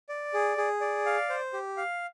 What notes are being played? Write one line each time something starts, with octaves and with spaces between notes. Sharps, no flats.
D5
G#4
G#4
D5
F5
C5
G4
F5